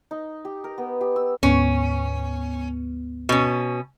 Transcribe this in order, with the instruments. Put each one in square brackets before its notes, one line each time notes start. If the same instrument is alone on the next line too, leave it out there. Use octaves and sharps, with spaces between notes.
[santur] D#4
G4
A#4
B3
G4
E6
[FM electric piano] D2 G#2 B3 [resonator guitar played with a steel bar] C#4
[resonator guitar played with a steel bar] B2 C#4